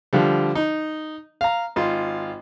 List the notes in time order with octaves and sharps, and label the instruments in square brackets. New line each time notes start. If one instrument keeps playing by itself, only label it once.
[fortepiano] D3 F3 G3
D#4
F5 A#5
G#1 F4